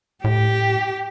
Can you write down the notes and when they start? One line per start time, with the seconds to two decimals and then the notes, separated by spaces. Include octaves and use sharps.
0.24 A2 G4